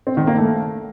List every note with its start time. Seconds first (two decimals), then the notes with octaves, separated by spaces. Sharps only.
0.07 C4
0.17 D#3
0.27 A#3
0.38 A3